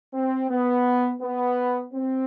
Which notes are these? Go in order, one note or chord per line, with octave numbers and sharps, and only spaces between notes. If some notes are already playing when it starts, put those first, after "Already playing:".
C4
B3
B3
C4